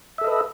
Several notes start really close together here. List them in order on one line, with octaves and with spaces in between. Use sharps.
E5 A4 D#5 B4